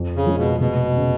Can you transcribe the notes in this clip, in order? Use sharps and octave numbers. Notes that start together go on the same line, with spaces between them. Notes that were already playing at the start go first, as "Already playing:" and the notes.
Already playing: F2
C#3
F3 G#3
B2
F1 B2
C#3